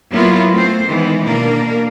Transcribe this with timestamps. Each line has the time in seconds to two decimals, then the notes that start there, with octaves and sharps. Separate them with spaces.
0.13 F#3 A#3 B3 E4 F4
0.52 A3 C4 C5
0.86 D#3 E3 G#3 B3
1.25 B2 A#3 D4 A#4